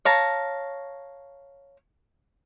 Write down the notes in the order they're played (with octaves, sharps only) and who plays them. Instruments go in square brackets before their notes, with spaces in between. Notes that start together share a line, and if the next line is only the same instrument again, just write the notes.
[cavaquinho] C#5 F5 A5 A#5